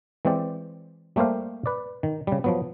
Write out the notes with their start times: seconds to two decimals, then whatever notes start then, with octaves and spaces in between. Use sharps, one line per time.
0.25 E3 G#3 C4 G4 D5
1.16 G3 A3 A#3 G4 C5 F5
1.66 B4 D5
2.03 D#3
2.27 C#3 G3
2.44 F3 F#3 B3